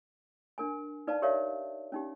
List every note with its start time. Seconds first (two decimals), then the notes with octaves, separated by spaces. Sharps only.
0.58 D4 A#4 G#5
1.07 D#4 B4 D5 F5 A5
1.22 G4 A#4 C#5 D5 E5 F5
1.92 C#4 D#4 G4